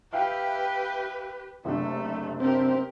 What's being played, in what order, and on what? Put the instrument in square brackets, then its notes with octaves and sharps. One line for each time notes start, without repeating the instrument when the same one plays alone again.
[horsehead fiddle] G4 B4 [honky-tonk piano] E5 F5 G5
[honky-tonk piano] F#1 C3 D4 [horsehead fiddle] A3
[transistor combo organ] C4 [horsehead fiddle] G4 A#4